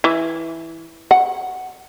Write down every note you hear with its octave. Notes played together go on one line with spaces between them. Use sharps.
E3
F#5